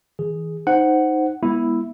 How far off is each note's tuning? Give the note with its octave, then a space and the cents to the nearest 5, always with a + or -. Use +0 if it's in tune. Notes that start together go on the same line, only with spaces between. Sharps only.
E3 -35 G#4 +0
D#4 +0 C5 +0 F#5 +5
G#3 -25 B3 -25 E4 +0